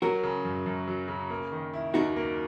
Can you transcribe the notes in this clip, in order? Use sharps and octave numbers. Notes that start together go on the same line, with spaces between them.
F#3 F#4 A#4
C#3
F#2
F#2
F#3
C#3
A#3
D#3
E4
D#2 D#4 F#4
A#3